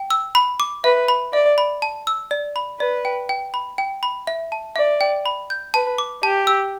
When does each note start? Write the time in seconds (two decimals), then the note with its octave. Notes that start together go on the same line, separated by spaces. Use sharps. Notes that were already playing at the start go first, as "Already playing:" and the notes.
Already playing: G5
0.10 E6
0.35 B5
0.60 D6
0.84 B4 E5
1.08 B5
1.33 D5 E5
1.58 B5
1.82 A5
2.07 E6
2.31 D5
2.56 B5
2.80 B4 D5
3.05 G5
3.29 G5
3.54 B5
3.78 G5
4.03 B5
4.27 E5
4.52 A5
4.76 D5 E5
5.01 G5
5.26 B5
5.50 G6
5.74 B4 A5
5.98 D6
6.23 G4 A5
6.47 E6